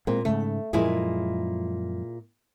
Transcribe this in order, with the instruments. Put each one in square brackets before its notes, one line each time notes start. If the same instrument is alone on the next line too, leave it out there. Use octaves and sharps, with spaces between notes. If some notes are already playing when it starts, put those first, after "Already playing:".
[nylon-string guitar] A#2 [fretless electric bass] G#3 A#3 C4
[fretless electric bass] G#2 C#3 [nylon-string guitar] A3
[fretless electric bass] F#2 F3 G#3 [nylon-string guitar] A#2 E4 G#4